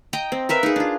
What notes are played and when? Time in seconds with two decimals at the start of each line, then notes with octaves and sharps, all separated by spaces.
0.13 D#5 G5 A#5
0.32 C4
0.49 A#4 B4 E5 F5
0.63 D#4 G#4
0.76 D4 F4